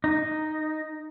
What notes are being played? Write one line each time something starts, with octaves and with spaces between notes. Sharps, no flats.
D#4